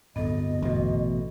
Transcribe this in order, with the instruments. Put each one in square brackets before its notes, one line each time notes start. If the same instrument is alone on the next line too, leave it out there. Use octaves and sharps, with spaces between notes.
[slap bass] D1 G2 [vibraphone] B3 A4 [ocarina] D#5
[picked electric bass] A1 B2